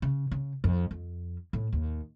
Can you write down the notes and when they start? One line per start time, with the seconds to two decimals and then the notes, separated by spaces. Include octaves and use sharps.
0.02 C#3
0.31 C#3
0.64 F2
0.91 F2
1.53 A2
1.73 D#2